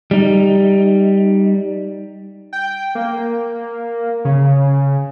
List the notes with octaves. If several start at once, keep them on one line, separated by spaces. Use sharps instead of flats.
G3 D#4
G5
A#3
C#3